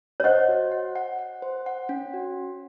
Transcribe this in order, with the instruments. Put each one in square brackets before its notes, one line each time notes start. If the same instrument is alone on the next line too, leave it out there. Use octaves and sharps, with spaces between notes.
[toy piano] C#5
[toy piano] C5 D#5 [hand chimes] F#5
[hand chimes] F#4
F#5
F#5
F#5
C5
F#5
C#4
F#4